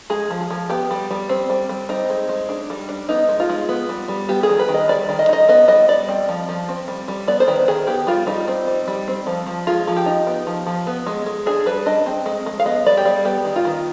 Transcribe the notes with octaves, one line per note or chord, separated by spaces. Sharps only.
G#3 G#4
F3
G#4
F3
B3 G4
G3
G3
C4
G3
G3
C4 D#4
G#3
G#3
D4
G3
D4
B3 D#4
G#3
F4
G#3
B3
G3
G3
B3 G4
G#4
D#3
B4
D#3
D#5
G3 D5
D#3
D#5
D#4 D#5
B3 D#5
G3 D#5
G3 D5
C4
F3
F3
C4
G3
G3
B3 D5
C5
D#3 B4
D#3 G#4
B3 G4
G3 F4
G3 D#4
C4
G3
G3
C4
F3
F3
G#3 F4
F3
G4
D#4
B3
F3
F3
B3
G#3
G#3
D4 G#4
G3 B4
D4 D#5
C4
G#3
G#3
F5
B3 D#5
G3 D5
G4
G3 G#4
B3 G4
D#3
F4
D#3